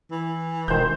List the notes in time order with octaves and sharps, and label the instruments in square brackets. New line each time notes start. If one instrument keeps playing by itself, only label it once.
[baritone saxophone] E3
[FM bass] E1 [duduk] D#3 [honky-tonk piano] C5 G6